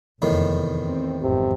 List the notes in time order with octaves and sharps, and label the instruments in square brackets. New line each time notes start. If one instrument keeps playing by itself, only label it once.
[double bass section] F1 [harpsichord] E2 A2 D#3
[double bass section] C4
[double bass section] G#1 F2 G#2 [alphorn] C3